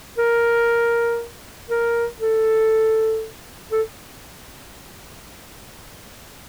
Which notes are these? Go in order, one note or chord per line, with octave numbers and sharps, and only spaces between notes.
A#4
A#4
A4
A4